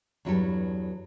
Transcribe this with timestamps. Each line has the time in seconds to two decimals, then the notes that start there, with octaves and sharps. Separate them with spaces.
0.25 E2 G2 F#3 E4 G4 A4